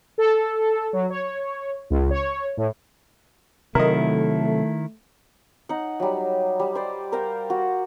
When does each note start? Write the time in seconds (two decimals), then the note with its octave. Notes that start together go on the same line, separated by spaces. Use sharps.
0.18 A4
0.93 F#3
1.10 C#5
1.90 C#2
2.10 C#5
2.57 A2
3.75 C3 D#3 F#3 A3 E4 A#4 D#5
5.69 D#4 F#5
6.00 F#3 G3
6.60 G3
6.75 C5 D5
7.12 A#4 C5 F5 G5
7.50 F#4